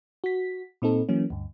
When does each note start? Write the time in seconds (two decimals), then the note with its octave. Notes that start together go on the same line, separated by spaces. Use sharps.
0.24 F#4 B6
0.82 A#2 C4 D#4 A4
1.09 E3 F#3 A#3 C#4
1.30 D2 G2